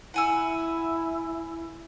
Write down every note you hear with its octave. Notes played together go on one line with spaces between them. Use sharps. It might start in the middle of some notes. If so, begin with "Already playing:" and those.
E4 F#5 G#5 E6